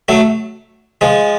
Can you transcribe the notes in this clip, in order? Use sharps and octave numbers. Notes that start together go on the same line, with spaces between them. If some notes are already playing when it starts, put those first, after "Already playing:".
F#3 A3
F3 G#3